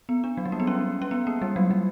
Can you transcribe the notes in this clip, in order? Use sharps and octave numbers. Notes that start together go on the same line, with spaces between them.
B3
D4
F#3
G3
A#3
B3
C#4
C#4
B3
A#3
G3
F#3
G3